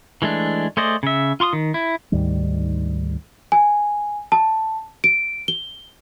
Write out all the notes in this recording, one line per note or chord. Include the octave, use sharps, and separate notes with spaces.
E3 G#3 A3 D4
A3 G#4 C5 D5 D#5
C#3 E5
F4 C6 C#6 D#6
D#3
E4
D2 G#2 D#3 G3
G#5
A5
D7
G7